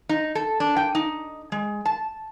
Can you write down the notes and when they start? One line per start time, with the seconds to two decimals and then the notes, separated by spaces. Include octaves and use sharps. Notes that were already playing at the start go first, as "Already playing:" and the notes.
0.09 D#4
0.35 A4
0.60 D4
0.77 G5
0.95 D#4
1.52 G#3
1.85 A5